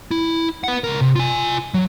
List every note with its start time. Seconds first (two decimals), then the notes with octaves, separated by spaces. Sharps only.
0.11 E4
0.64 B4 F#5
0.84 C#2 A#4
1.01 C3
1.16 F4 G#5
1.74 F#3